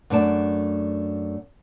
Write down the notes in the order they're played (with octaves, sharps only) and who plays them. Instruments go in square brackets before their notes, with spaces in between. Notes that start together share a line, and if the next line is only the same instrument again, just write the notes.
[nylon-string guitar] F#2 A3 D4 D5 A5